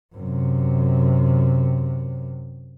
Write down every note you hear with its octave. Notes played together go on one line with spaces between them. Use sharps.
F#2 C3